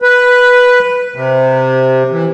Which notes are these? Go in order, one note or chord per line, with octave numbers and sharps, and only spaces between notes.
B4
C3
E3